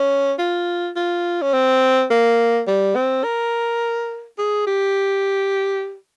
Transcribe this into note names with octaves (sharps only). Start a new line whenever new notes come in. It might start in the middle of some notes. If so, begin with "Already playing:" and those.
Already playing: C#4
F4
F4
C#4
C4
A#3
G3
C4
A#4
G#4
G4